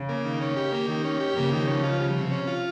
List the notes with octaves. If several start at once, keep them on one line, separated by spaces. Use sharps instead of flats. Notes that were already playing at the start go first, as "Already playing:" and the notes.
Already playing: C#3
A#3
D#3
C#4
G4
A#3
D#3
C#4
G4
C#3 F3 A#3
D#3
C#4
F4
G3
C3
C#4
F4